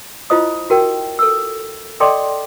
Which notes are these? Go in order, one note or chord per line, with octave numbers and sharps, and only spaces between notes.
E4 F4 C5 D#5 D#6
F#4 A#4 G5
A4 E6
A4 D5 D#5 G5 C6 D6